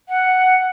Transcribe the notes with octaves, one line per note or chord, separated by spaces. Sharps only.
F#5